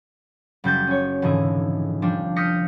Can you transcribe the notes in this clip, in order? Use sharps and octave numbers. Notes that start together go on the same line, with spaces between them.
F#1 G3 G6 A6
C#4 C#5
F1 G#2 D3 E3 G#4
F3 G3 D4
D#6 F6 G6 A#6 B6 C#7